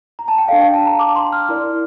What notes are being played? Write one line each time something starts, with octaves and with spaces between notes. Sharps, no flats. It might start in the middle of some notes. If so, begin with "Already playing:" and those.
A#5
A5
G5
D4 A4 D5 F5
G5
A5
A#5
D6
C6
F6
E4 A#4 D5